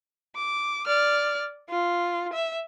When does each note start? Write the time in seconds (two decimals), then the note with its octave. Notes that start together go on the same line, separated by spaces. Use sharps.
0.36 D6
0.87 D5 F6
1.69 F4
2.33 E5